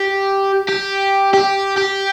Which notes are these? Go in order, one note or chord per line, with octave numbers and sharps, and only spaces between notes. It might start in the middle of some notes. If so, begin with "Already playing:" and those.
Already playing: G4
G4
G4
G4